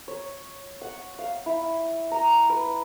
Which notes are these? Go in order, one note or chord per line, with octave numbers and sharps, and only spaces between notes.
C#5
F#5
F5
E4
A#5
B4